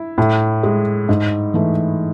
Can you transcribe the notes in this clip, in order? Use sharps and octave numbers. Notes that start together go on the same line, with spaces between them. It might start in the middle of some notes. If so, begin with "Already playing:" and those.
Already playing: E4
A2
G#3
G#2
E3 A3